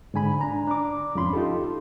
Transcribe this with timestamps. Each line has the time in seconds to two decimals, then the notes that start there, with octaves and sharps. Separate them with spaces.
0.14 G#2 D3 G#5 B5
0.41 D4 A#5
0.67 D4 D6
1.15 F2 G#2 F3 C#4 B5 C6
1.33 D#4 F4 G4 A4